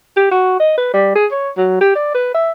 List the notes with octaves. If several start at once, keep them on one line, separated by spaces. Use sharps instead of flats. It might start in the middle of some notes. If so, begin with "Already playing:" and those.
G4
F#4
D#5
B4
G3
G#4
C#5
F#3
G4
D5
B4
E5